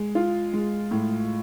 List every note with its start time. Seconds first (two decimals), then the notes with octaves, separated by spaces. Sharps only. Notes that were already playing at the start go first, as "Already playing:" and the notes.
Already playing: G#3
0.15 F4
0.53 G#3
0.91 A2